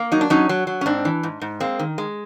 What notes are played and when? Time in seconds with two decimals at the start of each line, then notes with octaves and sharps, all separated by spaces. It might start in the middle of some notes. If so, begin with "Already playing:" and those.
Already playing: A#3
0.12 F#3 D#4
0.21 D4
0.30 F#3 C#4 D#4
0.49 F#3
0.67 F#3
0.81 C#4
0.86 G#2 C4 D4
1.05 E3
1.23 G#2
1.42 G#2
1.60 G#3 A#3 C4
1.79 D#3
1.98 G#3